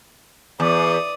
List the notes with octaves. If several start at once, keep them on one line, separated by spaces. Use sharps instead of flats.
E2 D5 D#6